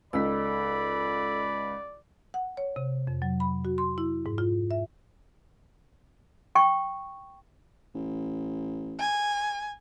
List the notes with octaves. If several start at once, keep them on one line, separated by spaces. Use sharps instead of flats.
C#2 D#4 A4 D5 B5 E6 B6
F#5
C#5
C3
F2
F#3
B5
F#4
C6
E4
G#2
F4
E5
G5 C#6
A1
G#5